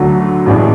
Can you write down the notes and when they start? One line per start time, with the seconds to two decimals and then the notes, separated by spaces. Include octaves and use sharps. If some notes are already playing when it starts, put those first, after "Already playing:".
Already playing: D2 D3 F#3 A3
0.46 A1 A2 E3 G#3 D4